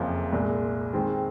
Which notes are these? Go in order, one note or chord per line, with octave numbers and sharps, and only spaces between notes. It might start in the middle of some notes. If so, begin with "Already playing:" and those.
Already playing: F#1 F2 C#3 F3 A#3
C2 A#2 G#3
D#3 G#3 C4